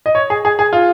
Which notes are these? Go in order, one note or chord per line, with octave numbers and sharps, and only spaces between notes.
D#5
C#5
G#4
G#4
G#4
F4